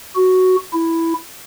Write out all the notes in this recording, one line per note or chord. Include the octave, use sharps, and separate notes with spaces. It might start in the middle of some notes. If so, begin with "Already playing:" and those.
F#4
E4